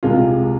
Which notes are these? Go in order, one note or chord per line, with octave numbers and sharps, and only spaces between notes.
C2 C3 G#3 F4